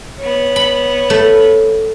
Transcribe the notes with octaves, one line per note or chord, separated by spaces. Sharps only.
B3 C#5
B5
A3